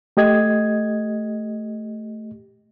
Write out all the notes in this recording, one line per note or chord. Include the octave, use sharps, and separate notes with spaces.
A3 G4 D#5 G#6